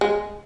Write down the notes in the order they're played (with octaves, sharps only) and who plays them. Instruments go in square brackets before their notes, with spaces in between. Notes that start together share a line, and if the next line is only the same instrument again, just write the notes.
[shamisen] G#3